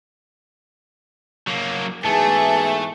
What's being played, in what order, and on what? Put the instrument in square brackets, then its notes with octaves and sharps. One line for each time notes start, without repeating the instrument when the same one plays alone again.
[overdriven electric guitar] F#3 A#3
[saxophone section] G#2 B2 E3 [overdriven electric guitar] A3 [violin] G#4 [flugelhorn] A5